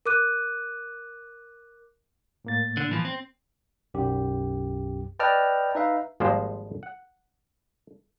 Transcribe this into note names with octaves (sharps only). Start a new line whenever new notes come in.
A#4 D6 F#6 D#7
A2 A#3 A6
D3
E3 F3
C4
B1 F#2 G4
B4 D5 D#5 G5 A5 F6
D#4 B4 E5 F5
G#1 F3 G3 G#3 A#3 C5
F#5